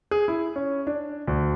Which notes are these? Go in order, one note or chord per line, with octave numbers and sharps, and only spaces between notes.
G#4
E4
C#4
D4
D2